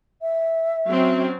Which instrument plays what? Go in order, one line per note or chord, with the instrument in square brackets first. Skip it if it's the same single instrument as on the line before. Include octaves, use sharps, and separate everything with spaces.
[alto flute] E5
[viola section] F#3 C4 C#4